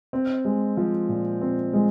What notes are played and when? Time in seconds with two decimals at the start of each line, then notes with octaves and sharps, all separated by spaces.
0.13 C4
0.45 G#3
0.77 F3
1.09 A#2
1.41 C4
1.73 G#3